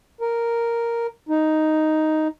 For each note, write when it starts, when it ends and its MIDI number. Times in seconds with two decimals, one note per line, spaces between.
0.21 1.07 70
1.29 2.28 63